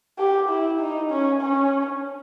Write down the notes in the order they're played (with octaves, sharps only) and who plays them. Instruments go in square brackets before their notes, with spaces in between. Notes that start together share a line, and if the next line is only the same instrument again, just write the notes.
[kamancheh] G4
E4
D#4
C#4
C#4